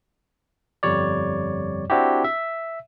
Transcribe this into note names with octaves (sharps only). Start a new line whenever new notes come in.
G1 F2 G3 C#5 D5
C4 D4 E4 F#4 G4
E5